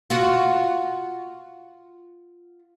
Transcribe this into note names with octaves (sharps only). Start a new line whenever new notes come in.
F4 F#4